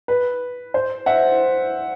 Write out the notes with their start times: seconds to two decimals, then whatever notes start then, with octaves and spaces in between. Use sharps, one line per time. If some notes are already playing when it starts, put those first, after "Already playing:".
0.08 B4
0.74 C5
1.06 E5 F#5